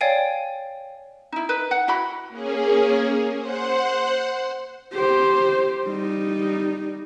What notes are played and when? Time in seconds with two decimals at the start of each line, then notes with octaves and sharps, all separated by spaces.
0.01 C#5 D5 F5 G5 G#5
1.32 D#4 E4
1.49 D#4 B4
1.71 F#5
1.88 E4 F#4 B5
2.29 A#3 C#4 G#4
3.38 C5 F#5 C6
4.93 G4 C5
5.85 G3 D#4